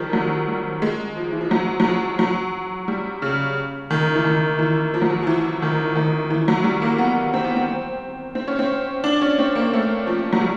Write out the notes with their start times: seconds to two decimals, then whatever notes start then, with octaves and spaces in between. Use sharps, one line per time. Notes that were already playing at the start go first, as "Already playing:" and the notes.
Already playing: D#3 F3 G3
0.13 F#3
0.48 G3
0.82 G#3
1.17 F3
1.32 E3
1.41 F3
1.51 F#3
1.80 F#3
1.85 F3
2.19 F#3
2.88 G3
3.22 C#3
3.90 D#3
4.15 E3
4.24 D#3
4.59 E3
4.94 F3
5.02 F#3
5.10 F3
5.23 F3
5.27 E3
5.62 D#3
5.95 D#3
6.30 E3
6.48 F#3
6.64 G3
6.82 A#3
6.98 B3
7.34 C4
7.44 B3
7.56 C4
8.35 C4
8.48 C#4
8.59 C4
9.04 D4
9.22 C#4
9.39 C4
9.55 A#3
9.73 A3
10.07 F3
10.33 F#3
10.41 G3